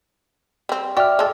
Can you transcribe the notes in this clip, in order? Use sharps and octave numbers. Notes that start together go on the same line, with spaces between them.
G3 C4
F#4 D5 E5 G5 F6
G#3 A4